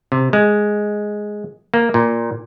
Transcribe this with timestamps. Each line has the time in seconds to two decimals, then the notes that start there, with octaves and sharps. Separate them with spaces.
0.12 C3
0.33 G#3
1.74 A#3
1.94 A#2